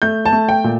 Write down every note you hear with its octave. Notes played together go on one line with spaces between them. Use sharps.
A3 G6
A5
A3
G5
A#2